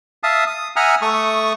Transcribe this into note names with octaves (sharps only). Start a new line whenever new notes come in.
E5 F5 A5 D#6
D#6
E5 F#5 G#5 A#5 D#6 F6
A3 A4 C#6 D#6